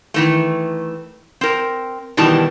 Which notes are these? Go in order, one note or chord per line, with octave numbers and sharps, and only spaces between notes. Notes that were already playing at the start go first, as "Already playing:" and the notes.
D#3 E3 A3
C4 A#4
B2 D#3 E3 G3 A5